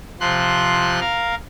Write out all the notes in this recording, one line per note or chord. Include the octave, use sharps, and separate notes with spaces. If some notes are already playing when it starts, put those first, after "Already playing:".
C3 F3 C6 F#6
A#4 F5